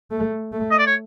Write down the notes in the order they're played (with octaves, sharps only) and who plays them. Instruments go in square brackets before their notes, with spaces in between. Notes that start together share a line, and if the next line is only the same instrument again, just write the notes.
[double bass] A3
A3
[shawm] D#5
D5
C#5